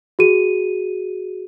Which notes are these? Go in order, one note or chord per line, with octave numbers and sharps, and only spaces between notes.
F#4 G#4 D#7